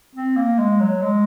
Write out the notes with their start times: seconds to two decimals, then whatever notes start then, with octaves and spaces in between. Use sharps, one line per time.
0.15 C4
0.37 A#3
0.58 G#3
0.80 F#3
1.02 G#3